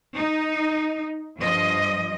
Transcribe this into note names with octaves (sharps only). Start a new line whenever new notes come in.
D#4
G2 F3 D#5